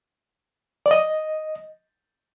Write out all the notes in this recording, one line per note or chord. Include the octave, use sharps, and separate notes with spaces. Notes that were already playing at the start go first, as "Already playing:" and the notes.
D5
D#5